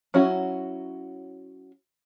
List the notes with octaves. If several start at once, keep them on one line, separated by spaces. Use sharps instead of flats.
F#3 C#4 E4 F#4